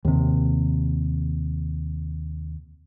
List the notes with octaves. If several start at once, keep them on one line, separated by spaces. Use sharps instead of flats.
D#2 C3